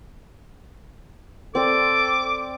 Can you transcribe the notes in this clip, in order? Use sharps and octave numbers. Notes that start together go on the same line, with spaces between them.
C4 A4 D5 D6